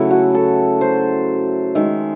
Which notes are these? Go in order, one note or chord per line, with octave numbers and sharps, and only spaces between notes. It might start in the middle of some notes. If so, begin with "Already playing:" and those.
Already playing: C#3 F#3 A3 E4
F#4
A4
C5
D#3 G#3 E5